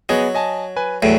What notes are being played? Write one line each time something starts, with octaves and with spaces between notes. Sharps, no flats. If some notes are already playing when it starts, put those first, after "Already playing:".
F#3 B3 G#4 D#5
D#5 G#5 A5
B4 G#5
E2 A2 F#3 D7